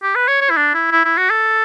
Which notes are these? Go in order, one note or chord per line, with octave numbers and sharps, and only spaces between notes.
G4
B4
C#5
C#5
E4
D4
E4
E4
E4
F#4
A4